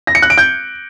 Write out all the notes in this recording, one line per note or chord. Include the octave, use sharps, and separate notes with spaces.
A#6
C#7
F#6
D7
G6